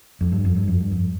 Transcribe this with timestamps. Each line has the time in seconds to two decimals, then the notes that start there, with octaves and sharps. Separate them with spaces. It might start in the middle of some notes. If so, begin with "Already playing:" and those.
0.21 F2
0.32 G2
0.45 F2
0.56 G2
0.68 F2
0.80 G2
0.91 F2